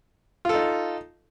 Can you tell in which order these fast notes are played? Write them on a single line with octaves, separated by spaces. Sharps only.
F4 A4 D#4